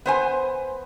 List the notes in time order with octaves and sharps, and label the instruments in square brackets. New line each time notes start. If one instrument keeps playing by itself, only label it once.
[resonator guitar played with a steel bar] B3 C5 G#5